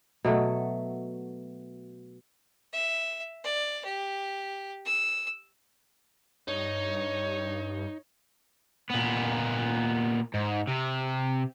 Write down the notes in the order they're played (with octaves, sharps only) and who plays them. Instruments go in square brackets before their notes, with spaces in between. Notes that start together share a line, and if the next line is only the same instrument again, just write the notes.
[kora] B2 F#3 A3
[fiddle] E5
D5
G4
E6
[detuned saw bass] G2 [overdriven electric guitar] D#4 [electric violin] C#5
[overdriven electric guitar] A#2 B3
G#2
C3